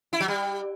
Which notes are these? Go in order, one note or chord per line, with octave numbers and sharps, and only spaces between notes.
E4
F#3
G3